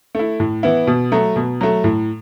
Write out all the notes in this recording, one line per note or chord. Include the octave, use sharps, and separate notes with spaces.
A3 E4
A2
E3 B3 E4
B2
F#3 A3
B2
F#3 A3
A2